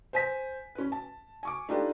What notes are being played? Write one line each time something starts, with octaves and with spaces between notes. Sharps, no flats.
C5 G#5 B6
C#4 B4
A5
G#5 C#6 D6
D4 D#4 F4 G4 A4 B4